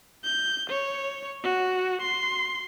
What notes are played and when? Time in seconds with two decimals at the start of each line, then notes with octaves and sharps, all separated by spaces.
0.24 G6
0.70 C#5
1.44 F#4
2.02 C6